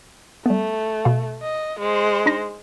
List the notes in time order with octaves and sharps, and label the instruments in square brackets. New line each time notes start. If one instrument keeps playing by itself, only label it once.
[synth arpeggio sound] G3 B3 [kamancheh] A3
[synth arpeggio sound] B2 F5
[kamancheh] D#5
G#3 C5
[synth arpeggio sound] D4 D#4 A#6